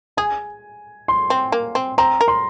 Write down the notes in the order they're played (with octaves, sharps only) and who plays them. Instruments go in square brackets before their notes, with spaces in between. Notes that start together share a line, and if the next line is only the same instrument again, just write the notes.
[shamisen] G#4 [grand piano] G#5
[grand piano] C6
[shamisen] C4
A#3
C4
[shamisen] C4 [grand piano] A#5
[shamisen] A#4
[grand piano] C6